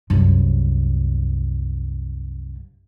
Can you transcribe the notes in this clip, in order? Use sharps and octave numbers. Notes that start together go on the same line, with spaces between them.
C2 F#2